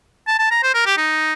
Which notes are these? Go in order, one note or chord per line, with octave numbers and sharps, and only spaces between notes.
A5
A5
A#5
C5
A#4
G4
D#4